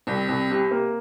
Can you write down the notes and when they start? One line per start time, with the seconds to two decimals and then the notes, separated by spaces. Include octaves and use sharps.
0.07 C2 C4
0.28 C2
0.50 C3
0.71 A#3